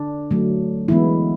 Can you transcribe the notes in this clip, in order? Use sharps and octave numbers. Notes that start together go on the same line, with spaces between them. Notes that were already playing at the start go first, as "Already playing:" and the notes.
Already playing: D3 D4
D3 F#3 A3
E3 G#3 B3 E4